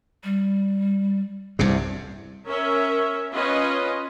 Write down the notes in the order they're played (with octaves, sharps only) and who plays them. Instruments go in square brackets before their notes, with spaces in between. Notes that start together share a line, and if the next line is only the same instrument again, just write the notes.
[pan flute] G3
[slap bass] C2 G2 C3
[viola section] C#4 A#4 C#5 E5
C#4 F4 B4 D#5